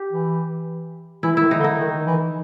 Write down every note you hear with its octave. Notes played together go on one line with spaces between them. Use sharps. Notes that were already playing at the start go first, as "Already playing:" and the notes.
Already playing: G4
E3
E3 E4
D#3 E4
D#4
D3
D#4
D#3
E3